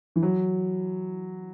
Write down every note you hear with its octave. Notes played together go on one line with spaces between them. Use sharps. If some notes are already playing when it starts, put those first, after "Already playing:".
E3
F#3